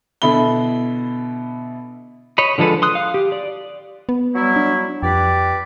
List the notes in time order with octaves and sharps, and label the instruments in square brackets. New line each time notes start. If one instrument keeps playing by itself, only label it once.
[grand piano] B2 D3 E4 B5 G7
[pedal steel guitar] C#5 D#5 B5
D3 F3 G#3 A4 B4
C6 D#6 F#6
F5
G4
D5
[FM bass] B3
[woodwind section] F#3 G3 E4
[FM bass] D4
[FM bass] F2 [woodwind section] G4 B4 D5